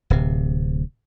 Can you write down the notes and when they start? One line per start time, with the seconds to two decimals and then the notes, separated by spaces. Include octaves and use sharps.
0.10 D1 C3